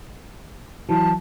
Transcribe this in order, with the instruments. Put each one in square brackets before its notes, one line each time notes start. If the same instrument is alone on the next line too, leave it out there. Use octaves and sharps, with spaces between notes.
[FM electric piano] E3 F#3 [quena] A5